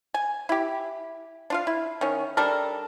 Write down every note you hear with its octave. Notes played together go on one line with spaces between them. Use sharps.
G#5
E4 G4
D4 F4 F5
E4
D#3 C#4
G3 D4 A4 A#4